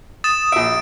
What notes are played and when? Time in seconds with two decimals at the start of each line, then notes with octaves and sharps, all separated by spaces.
0.24 D#6 A6 E7
0.52 A#1 E5 D7